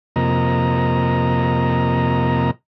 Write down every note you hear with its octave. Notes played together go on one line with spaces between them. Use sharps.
F2 C3 A#3 D#5 A#5